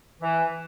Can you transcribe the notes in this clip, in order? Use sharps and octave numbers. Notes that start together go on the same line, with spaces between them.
E3